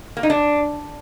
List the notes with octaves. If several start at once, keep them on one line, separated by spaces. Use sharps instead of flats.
A#3
D#4
D4